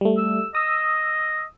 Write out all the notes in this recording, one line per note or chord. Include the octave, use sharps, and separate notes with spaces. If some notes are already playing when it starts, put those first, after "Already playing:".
G3 A3
E6
D#5 D#6 E6